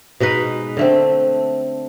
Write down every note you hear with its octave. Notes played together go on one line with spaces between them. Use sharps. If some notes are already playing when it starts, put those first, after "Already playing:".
B2 G#3 D#4 B4
D3 A3 C4